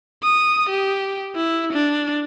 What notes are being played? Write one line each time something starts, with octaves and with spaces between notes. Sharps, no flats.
D#6
G4
E4
D4